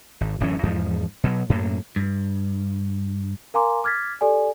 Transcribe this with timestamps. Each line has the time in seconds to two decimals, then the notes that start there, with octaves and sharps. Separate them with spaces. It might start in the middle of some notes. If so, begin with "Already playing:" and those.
0.21 G#1
0.40 D1 F#2 E3 C#4
0.63 E2 G#2 F3
1.24 B2 F#3
1.49 F#2 A2 A#3
1.96 G2
3.54 A#4 F5 G#5 A#5 C6 D6
3.84 D6 F6 G#6 A6 B6
4.21 G4 A4 D5 G#5